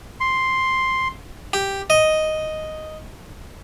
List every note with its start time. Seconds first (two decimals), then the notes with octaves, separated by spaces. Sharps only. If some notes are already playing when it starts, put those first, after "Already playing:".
0.20 C6
1.53 G4
1.90 D#5